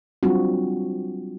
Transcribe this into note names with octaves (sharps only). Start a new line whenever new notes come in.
F#3 G3 C4 D4 F4 F#4